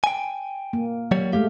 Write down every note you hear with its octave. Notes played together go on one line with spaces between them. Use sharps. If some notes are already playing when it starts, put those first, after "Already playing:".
G5 G#5
A#3
F#3 G3 C#5
G#3 A3 G4 F5